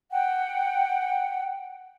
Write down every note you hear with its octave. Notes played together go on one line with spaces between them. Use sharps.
F#5 G5